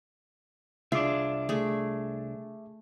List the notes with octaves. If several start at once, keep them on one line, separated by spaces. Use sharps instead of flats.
C2 D4 F4 G#4 E5 D6
A3 G#4